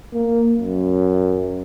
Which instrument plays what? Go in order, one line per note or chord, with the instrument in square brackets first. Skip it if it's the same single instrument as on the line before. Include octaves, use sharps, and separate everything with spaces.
[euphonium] A#3
F#2